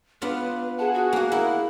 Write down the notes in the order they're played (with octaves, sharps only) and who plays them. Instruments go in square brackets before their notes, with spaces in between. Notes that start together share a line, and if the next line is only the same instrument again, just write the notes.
[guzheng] B3 D4 F4 [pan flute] B4
[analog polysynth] G#4 F#5 [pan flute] A5
[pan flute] F#4
[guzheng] A#3 D#4
[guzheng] E4 [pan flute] A#4